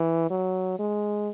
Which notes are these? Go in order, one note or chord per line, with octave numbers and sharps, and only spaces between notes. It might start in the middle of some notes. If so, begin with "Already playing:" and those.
Already playing: E3
F#3
G#3